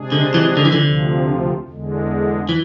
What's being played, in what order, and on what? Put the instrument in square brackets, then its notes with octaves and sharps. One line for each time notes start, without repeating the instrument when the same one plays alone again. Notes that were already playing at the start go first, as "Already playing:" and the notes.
Already playing: [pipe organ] C3 G#3 D4 G#4
[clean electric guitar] D3
E3
D3
E3
D3
[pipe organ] D2 C3 F3
E2 D3 G#3
[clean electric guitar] E3